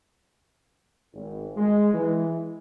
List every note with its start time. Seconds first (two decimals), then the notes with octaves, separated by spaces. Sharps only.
1.13 G#1
1.56 G#3
1.93 E3